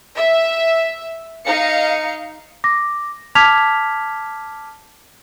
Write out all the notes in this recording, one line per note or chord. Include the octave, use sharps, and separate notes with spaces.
E5
D#4 F5 C#7
D6 A#6
A5 D6 F6 G#6 B6 F7